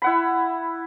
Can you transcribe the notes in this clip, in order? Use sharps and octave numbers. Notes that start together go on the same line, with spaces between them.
E4 F#5 B5